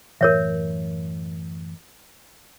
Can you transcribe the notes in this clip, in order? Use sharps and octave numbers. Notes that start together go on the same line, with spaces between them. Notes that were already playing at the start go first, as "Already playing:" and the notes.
F#2 A2 E3 A#4 C#5 E5